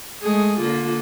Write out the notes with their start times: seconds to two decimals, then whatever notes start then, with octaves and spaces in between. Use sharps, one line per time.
0.23 G#3 A3 G#4
0.60 D3 A#3 F4